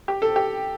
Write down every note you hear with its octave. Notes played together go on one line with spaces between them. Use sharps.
G4
A4
G4